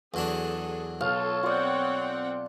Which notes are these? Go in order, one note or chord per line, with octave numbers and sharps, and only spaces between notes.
E2 F#3 D4 G#4 A4
B1 F4 A4 C#5 F5
C4 F4 D5 F#5 G5